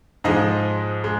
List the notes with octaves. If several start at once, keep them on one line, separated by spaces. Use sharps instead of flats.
G#2 F3 G#3 D#5
G#3